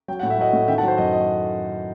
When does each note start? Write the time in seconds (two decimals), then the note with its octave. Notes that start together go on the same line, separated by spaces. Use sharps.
0.08 F#3 G5
0.20 A2 F#5
0.30 E5
0.38 F#3 D#5 F#5
0.53 A2
0.68 D#3 E5 G5
0.78 F#5 A5
0.83 F#3 C5
0.98 F#2 D#5
1.13 D#5